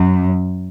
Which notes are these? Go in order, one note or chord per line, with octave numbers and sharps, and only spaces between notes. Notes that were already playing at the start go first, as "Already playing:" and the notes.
Already playing: F#2